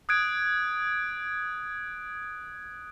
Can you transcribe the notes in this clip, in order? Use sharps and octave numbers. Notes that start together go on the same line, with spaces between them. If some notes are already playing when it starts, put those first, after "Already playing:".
D#6 F#6 G#6 D7